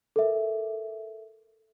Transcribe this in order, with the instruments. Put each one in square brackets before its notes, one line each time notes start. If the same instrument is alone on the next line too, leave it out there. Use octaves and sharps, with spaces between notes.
[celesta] A4 A#4 E5